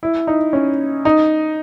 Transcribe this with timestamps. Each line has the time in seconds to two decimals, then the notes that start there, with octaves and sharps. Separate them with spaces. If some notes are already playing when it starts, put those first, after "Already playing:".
0.03 E4
0.27 D#4
0.53 C#4
1.05 D#4